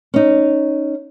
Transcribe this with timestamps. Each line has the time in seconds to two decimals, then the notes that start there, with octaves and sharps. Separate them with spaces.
0.14 C#4 D#4